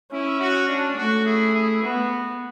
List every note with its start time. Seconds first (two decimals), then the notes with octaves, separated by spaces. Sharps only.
0.12 C#4 E4
0.40 F#4
0.68 D4
0.96 A3 F#4
1.24 E4 G#4
1.53 E4 G#4
1.82 B3 F#4